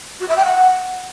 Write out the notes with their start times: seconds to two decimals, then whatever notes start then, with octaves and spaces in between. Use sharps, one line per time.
0.20 F#4
0.28 E5
0.36 G5
0.44 F#5